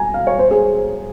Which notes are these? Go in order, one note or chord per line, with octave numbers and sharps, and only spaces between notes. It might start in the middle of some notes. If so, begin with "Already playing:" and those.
Already playing: G#5 A#5
F5
C#5
C5
G#4